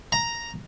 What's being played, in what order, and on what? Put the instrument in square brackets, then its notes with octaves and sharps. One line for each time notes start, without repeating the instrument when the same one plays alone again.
[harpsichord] A#5